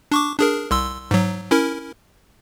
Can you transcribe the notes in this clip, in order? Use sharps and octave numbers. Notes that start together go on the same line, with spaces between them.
D4 C#6 D6
D4 G#4 A#4
C2 C6 E6
G#2 F#3
C#4 E4 A#4